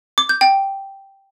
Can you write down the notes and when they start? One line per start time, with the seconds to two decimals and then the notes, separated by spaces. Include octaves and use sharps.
0.18 D6
0.29 G6
0.41 G5